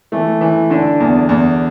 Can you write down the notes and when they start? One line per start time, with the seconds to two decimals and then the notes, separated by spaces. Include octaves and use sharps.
0.12 E3 A3
0.41 E3
0.70 D3 D4
1.00 E2
1.29 E2